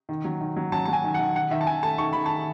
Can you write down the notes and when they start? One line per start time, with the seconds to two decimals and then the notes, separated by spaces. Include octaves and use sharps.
0.09 D#3
0.25 F#3
0.41 D#3
0.57 F#3
0.72 F#3 A5
0.85 A5
0.88 F#3 G#5
1.04 D#3
1.14 F#5
1.19 D#3
1.35 D#3 F#5
1.51 D#3 E5
1.61 A5
1.67 D#3 G#5
1.83 A3 A5
1.98 D#3 C#6
2.13 D#3 B5
2.26 D#3 A5